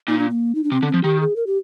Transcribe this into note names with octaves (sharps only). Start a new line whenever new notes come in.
A#2 D#4
D4
A#3
D#4
D4
C3 C4
D3
C4
F3
D#3 G4
G#4
A#4
G4